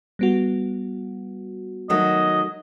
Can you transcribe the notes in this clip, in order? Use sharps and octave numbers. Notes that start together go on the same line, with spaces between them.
G3 B3 F#4
D#3 F#3 A3 D#5